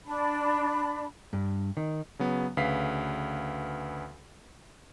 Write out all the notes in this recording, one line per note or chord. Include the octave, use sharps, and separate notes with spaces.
D4 B5
G2
D#3
C#3 F#3 B3
D2 C#3 B4 F5 B6 C7